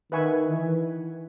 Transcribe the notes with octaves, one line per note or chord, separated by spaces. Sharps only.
D#3 B4 E5 G#5 C#6
E3